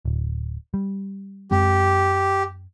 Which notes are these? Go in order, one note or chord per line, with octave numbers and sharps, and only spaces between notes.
D1
G3
F#2 G#3 C4 G4